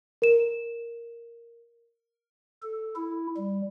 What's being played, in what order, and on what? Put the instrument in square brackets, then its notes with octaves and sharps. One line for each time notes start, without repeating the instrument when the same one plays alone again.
[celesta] A#4 E7
[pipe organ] A4
E4
G3